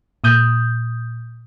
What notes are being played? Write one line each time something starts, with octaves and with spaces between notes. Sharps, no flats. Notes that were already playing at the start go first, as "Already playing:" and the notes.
A#2 D#6 G6